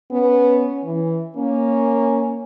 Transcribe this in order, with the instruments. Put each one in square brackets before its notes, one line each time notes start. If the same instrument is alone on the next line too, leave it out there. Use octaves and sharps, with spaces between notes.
[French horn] B3 [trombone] C#4
[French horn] E3
[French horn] A#3 [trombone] C#4